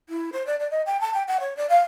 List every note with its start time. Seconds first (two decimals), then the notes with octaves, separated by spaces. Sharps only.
0.09 E4
0.33 C5
0.47 D5
0.60 D5
0.71 D#5
0.86 G5
1.01 A5
1.14 G5
1.28 F#5
1.40 C#5
1.57 D5
1.70 F5